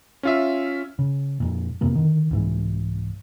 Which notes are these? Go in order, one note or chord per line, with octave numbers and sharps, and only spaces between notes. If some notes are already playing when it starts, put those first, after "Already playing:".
C#4 F4 E5
C#3
F2 A#2
F2 C3 A#3 B3
D3 D#3
C2 G#2 E3